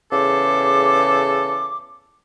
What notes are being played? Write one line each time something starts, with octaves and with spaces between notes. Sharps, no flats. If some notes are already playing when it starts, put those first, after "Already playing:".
E2 C#3 A4 D6